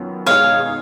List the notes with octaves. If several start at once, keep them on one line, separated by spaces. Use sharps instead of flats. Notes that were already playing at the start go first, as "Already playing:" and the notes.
Already playing: F#2 D#3 F#3 B3 F4
B2 G#3 D#4 G#4 C#5 F5